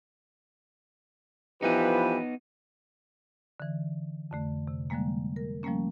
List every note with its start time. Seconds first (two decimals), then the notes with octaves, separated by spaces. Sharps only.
1.62 E3 F3 B3 D#4 G4 B4
3.60 D3 E3
4.31 F2 D3 A3
4.67 C3
4.90 D3 F3 G3 G#3 A#3
5.36 A#4
5.63 F3 G3 A3 A#3 C#4